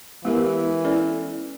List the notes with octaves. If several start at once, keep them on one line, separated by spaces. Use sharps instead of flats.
E3 G#3 B3 E4 G4 A#4
C#4 E4 A4 D5